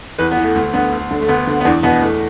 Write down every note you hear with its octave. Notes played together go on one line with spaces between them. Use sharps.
E2 B4
B3
E3
A3
D2 A3
D3 B3
D2
D3
A3
D2 B3
D3
B3
E2 D4
B2 B3
E2 A3